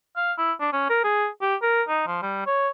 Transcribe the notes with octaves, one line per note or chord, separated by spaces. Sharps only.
F5
E4
D4
C#4
A#4
G#4
G4
A#4
D#4
F3
G3
C#5